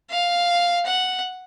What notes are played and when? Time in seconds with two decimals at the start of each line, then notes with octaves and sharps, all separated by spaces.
0.10 F5
0.86 F#5